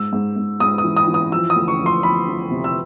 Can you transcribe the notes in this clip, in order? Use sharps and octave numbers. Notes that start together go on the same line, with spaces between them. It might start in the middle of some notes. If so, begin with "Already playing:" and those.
Already playing: G#2 E6
G#2
G#2
G#2 D#6
D#6
E3
D#6
E3
D#6
F3 E6
D#6
D2
C#6
F3
C6
F3 B5
F3
C3
E6